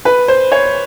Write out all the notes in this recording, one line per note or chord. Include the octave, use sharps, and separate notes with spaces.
B4
C5
C#5